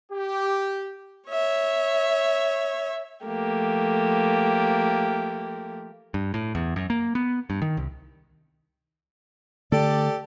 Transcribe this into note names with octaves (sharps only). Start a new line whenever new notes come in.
G4
C#5 E5
F3 A3 A#3 G4
G2
A2
E2
F#2
A#3
B3
G2
D#3
C2
D3 A3 G4 A4 D5